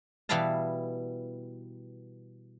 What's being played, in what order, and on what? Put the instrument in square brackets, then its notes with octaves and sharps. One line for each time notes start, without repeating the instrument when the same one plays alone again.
[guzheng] B2 E3 G3 E4 F5 A5